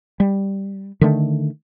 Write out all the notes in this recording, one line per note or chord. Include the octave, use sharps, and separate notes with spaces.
G3
D3 D#3 A3